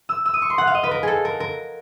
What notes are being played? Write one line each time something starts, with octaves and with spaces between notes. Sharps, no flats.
E6
E6
D#6
C#6
C6
F#5
F5
D#5
B4
A#4
G#4 A4
A#4
A#4